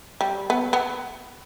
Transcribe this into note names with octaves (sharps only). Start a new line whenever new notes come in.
G3
B3
B3